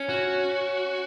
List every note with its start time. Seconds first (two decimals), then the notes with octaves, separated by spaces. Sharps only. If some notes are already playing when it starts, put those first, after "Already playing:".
Already playing: C#4
0.09 F#4